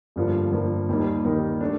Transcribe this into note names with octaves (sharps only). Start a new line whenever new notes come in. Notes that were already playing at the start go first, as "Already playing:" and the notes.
G1 G2 F3 A#3 F4
G1 G2 F3 A#3 F4
D#2 D#3 G3 A#3 D#4
D#2 D#3 G3 A#3 D#4
A3 D4